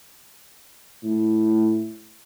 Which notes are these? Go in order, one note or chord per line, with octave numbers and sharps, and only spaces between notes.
A2